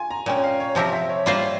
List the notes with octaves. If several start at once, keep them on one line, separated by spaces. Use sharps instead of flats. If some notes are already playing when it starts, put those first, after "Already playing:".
Already playing: F4 G#5
A#5
A#2 G#3 C#4 G5
F5
C#5
C3 F3 C4 G4 A#4 E5
E5
C#5
G3 A#3 F4 C5 F5